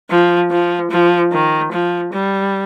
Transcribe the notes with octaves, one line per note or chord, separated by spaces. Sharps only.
F3
F3
F3
D#3
F3
G3